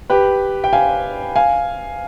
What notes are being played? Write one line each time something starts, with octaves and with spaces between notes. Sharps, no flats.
G4 B4
G5
F5 G#5
F5 G#5